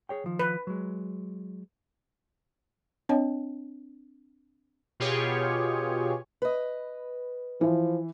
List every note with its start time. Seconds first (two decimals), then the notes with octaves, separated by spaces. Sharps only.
0.09 G#4 C#5 G5
0.24 D#3 F3
0.39 B4
0.67 F#3 G#3
3.09 C4 D4 C#5 D#5 A5
5.00 B2 F4 G4 G#4 C#5
6.42 B4 D#5
7.61 E3 F3